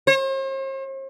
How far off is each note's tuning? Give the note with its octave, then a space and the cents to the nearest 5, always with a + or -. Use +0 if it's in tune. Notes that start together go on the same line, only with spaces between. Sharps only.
C5 +45